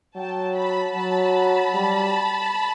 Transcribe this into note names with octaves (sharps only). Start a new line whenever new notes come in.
F#3 G5 A5
A5 B5
F#3 A5 B5
G3